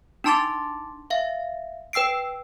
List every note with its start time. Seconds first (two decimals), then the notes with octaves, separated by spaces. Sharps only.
0.24 D4 D#4 A5 C6 D6 A6
1.10 E5 F5
1.93 B4 G5 E6 C7 D7